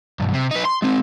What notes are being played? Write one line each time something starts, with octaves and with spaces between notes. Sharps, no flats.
B1 G2
C3
D#4 B4
C6
G#3 C4